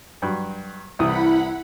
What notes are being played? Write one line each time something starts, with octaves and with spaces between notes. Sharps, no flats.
G2 F#3
C2 E3 E4 F#5 B5 D#6